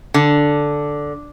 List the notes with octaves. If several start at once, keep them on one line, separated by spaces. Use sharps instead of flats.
D3